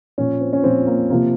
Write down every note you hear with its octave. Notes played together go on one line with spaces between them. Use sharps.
A#2 F3 C#4
C4
C#4
A#2 F3 C4
A#3
C3 F3 A#3